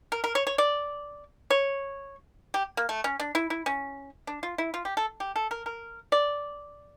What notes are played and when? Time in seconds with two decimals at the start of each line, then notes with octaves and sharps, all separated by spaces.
0.12 A#4
0.24 A#4
0.35 C#5
0.47 C#5
0.58 D5
1.50 C#5
2.54 G4
2.77 A#3
2.89 A3
3.04 C#4
3.20 D4
3.35 E4
3.50 E4
3.66 C#4
4.27 D4
4.43 F4
4.58 E4
4.74 F4
4.85 G4
4.97 A4
5.20 G4
5.36 A4
5.51 A#4
5.66 A#4
6.12 D5